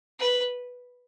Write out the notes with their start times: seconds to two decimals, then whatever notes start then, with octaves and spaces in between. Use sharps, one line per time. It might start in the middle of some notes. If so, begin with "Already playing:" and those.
0.20 B4